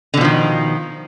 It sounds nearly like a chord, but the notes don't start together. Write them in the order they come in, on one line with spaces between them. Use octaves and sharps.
D3 B2 F3 D#3